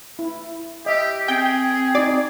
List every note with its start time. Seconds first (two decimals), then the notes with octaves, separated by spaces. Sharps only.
0.19 E4
0.86 G4 D#5 E5
1.28 C4 G#4 G5
1.95 D#4 F#4 D5